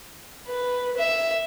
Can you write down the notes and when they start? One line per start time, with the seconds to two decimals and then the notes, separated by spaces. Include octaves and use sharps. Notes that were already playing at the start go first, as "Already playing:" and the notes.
0.48 B4
0.97 E5